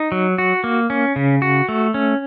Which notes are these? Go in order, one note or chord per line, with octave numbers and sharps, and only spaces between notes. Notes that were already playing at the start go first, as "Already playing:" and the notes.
Already playing: D#4
F#3
F#4
A#3
C#4
C#3
F#4
A3
C#4